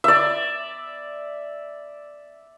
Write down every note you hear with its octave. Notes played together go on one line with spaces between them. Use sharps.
D5 E5